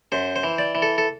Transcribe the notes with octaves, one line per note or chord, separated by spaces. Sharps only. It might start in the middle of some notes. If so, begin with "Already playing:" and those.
F#2 C5
C5
E3
D5
E3
A4
A4